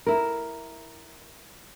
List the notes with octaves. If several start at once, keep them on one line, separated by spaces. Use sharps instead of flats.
E4 A#4